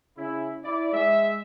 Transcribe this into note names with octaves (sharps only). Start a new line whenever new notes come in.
C#3 C#4 E4
E4 D5
G#3 E5